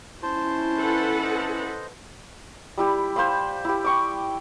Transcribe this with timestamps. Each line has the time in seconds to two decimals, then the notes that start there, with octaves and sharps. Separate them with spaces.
0.23 C#4 E4 C5 A5 C6
0.78 A4 B4 F#5
1.23 C5 D#5
2.77 G3 E4 G4
3.16 C5 F5 B5 C6
3.65 E4 G4
3.84 G5 C#6 D6